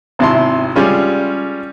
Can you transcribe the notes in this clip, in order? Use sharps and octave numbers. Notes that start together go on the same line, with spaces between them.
G#1 C3 E4 A5 C6
G3 G#3 C#4 F4